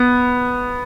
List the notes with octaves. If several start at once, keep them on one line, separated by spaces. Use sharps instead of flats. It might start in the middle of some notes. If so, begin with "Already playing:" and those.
Already playing: B3